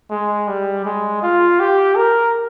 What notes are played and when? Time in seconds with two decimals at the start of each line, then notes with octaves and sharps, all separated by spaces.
0.10 G#3
0.47 G3
0.85 G#3
1.23 F4
1.60 G4
1.96 A#4